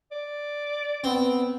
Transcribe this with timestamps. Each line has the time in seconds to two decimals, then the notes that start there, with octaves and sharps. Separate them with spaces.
0.11 D5
1.04 B3 C4